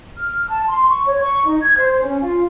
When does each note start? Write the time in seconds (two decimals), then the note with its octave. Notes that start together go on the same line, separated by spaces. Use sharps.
0.18 F6
0.49 A5
0.68 C6
0.89 C#6
1.05 C#5
1.21 C#6
1.45 D#4
1.62 G#6
1.78 C5
2.01 C#4
2.20 F4